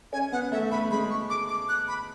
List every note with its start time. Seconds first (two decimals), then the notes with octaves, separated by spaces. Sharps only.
0.13 C#4 G#5
0.32 B3 F#5
0.52 A3 E5
0.71 A3 B5
0.91 G#3 B5
1.10 C#6
1.30 D6
1.49 D6
1.69 F#6
1.88 B5